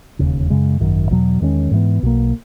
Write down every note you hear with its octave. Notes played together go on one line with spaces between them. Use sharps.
E1 D#2 C#3
F#2 C#3 G#3
G#1 F#2 D#3
E2 B2 F#3
E2 D#3 G#3 C#4
G#2 E3 B3
B1 B2 A#3